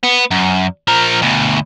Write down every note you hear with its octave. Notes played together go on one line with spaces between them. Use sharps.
B3
F#2
F3 A#4
D2 B2